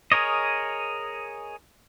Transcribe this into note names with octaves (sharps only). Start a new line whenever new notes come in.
G#4 A#4 C#5 D#5